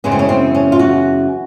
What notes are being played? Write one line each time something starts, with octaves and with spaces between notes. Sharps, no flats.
F#2 C#3 E3 G#3 B3 C#4
C4
C#4
C4
C#4
F4
F#4